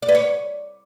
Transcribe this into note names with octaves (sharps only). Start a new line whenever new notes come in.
D5
B4
C#5